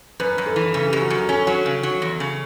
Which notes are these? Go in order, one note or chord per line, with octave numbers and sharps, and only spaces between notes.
F#2 B4
F#2
A4
E3
C#3 A4
F#2 G4
F#4
F#2
C#4 A4
F#3
C#3
F#3
E2
C#3